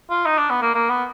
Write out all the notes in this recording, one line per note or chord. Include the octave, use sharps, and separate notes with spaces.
F4
D#4
D4
B3
A#3
A#3
B3